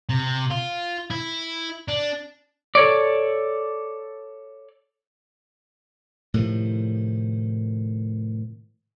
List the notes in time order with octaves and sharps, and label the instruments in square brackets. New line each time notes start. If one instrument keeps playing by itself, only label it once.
[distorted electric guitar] C3
F4
E4
D4
[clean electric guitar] A4 C#5 D5
[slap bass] A2 C3 D#3 F3